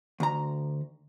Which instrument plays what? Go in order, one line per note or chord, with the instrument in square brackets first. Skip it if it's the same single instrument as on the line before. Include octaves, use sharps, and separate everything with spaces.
[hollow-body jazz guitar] D2 A#5